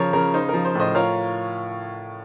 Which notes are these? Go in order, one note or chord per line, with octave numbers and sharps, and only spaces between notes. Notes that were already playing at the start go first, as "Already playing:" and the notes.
Already playing: C#3 F3 A#4 C#5
C#3 A#4
D#4 C5
A#4
F3
C5
A2 C5 D#5
F4 A#4 C#5